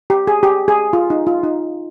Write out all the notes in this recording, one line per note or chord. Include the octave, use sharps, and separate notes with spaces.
G4
G#4
G4
G#4
F4
D#4
F4
D#4